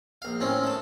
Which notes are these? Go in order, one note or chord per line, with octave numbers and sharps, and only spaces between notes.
A#1 F5
A2 D#3 C4 C#4
A3 A5